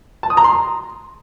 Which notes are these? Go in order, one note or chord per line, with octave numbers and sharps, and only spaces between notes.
A5
D#6
A#5
C6